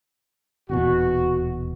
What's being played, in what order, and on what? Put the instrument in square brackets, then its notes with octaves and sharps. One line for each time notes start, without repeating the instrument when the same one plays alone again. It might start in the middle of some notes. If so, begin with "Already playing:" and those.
[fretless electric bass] D#1 E2 B2 [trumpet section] F#4